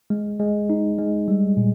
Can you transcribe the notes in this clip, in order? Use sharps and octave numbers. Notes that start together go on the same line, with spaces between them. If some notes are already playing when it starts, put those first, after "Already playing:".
G#3
G#3
D#4
G#3
G3
A#2